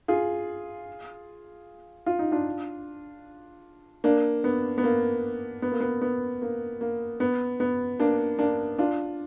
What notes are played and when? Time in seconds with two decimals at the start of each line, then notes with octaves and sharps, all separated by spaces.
0.08 F4 G#4
2.06 F4
2.19 D#4
2.32 D4 F4
4.04 A#3 D4
4.44 B3
4.78 B3
4.84 A#3
5.62 B3
5.72 A#3
5.80 B3
6.01 B3
6.42 A#3
6.81 A#3
7.20 B3
7.60 B3
7.99 A#3 D4
8.39 A#3 D4
8.79 D4 F4